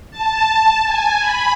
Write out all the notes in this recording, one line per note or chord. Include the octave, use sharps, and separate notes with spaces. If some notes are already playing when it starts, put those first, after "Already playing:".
A5
G#5
B5